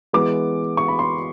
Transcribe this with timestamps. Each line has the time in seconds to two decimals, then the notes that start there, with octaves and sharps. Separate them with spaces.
0.13 E3 G#3 B3 D6
0.77 C#6
0.88 B5
0.99 C6